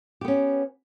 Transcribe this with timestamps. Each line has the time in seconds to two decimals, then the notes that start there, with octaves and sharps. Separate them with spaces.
0.21 G4
0.25 B3
0.28 C#4